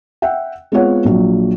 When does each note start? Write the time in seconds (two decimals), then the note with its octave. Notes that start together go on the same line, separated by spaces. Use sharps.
0.22 E5 F#5 G5
0.72 G#3 B3 C4 F4 C#5 F#5
1.05 A#1 F#3 F4